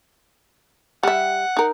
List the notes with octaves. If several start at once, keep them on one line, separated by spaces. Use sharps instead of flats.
G3 E5 F#5
D#4 A#4